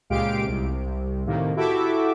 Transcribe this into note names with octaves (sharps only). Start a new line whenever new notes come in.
C#2 A#2 G#3 G4 F5 D7
C2 C3
A2 C3 D#3 A#3
E4 F#4 G4 A4 E5 D6